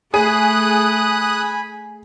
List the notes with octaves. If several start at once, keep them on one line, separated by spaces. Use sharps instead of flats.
A3 G#4 G#5 B5 D#6 F#6 D#7